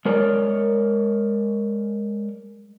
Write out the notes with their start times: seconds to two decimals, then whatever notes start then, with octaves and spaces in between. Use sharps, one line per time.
0.05 G#3 A#4 C#5 D5